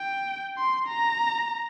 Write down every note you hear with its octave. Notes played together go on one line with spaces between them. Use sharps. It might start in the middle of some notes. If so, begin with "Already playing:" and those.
Already playing: G5
C6
A#5